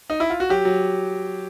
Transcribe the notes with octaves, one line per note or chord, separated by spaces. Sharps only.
D#4
E4
F4
F#4
F#3 G4
F#3